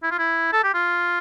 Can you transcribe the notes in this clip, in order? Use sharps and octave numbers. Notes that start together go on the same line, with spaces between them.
E4
F4
E4
A4
G4
F4